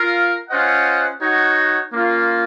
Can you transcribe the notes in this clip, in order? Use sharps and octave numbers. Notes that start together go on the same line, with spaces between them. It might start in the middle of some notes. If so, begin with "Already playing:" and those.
Already playing: F4 A#4 F5
C#4 F4 C5 D#5 F#5
D#4 F#4 C#5 F#5
A#3 C#4 F4